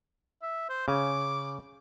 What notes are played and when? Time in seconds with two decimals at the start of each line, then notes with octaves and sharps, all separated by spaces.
0.42 E5
0.69 C5
0.88 C#3 G#5 D6